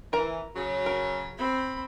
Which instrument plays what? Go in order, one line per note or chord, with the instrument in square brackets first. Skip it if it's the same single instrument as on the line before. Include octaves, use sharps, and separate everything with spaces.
[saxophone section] E3 [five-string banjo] A#4 A#5
[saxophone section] C#3 F#3
[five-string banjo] A#4
[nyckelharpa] C4 B5